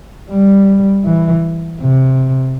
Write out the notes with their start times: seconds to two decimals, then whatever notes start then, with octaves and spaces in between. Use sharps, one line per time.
0.31 G3
1.06 E3
1.81 C3